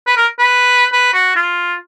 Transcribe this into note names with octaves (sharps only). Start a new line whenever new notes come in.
B4
A#4
B4
B4
F#4
F4